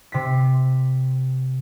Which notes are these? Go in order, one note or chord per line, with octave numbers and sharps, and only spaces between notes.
C3 B6